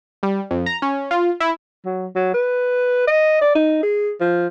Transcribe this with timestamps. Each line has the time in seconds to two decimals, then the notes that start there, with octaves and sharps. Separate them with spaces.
0.23 G3
0.51 F2
0.66 A#5
0.82 C#4
1.11 F4
1.40 E4
1.86 F#3
2.15 F#3
2.34 B4
3.07 D#5
3.41 D5
3.55 D#4
3.83 G#4
4.20 F3